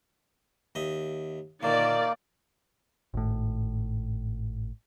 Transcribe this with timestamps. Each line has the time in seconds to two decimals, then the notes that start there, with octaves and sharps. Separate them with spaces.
0.75 D#2 D#5 E5
1.63 A#2 D3 D#3 A#3 D5
3.14 G#1 A2